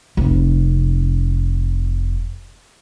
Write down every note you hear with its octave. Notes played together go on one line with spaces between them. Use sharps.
F1 C3